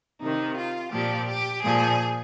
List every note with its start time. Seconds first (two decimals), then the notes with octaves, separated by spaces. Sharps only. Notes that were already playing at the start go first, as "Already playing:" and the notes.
0.20 C3 D#3 D#4
0.57 F4
0.92 A#2 F3 G4
1.28 G4
1.63 A#2 F3 G#4